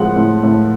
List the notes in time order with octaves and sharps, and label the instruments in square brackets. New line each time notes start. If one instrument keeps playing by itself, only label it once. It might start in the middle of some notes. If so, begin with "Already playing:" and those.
Already playing: [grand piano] A2 F3 G#3 F#5
A2
A2